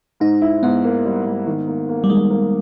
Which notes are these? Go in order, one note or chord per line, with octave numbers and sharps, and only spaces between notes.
G#2 D#4
E4
G#2 B3
A#3
G3
G#2
D#3
A#3
A#3
G3
D#3 G#3
A#3